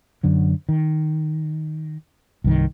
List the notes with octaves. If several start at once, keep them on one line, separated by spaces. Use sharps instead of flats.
F#2 D3 F#3
D#3
C2 G2 D#3